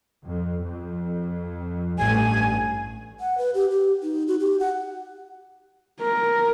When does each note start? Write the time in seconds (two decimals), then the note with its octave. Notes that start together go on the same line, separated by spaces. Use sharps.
0.25 F2
0.64 F2
1.98 A1 G2 A3 G#5
3.20 F#5
3.38 B4
3.54 G4
3.71 G4
4.03 D#4
4.28 F#4
4.40 G4
4.60 F#5
6.01 A#4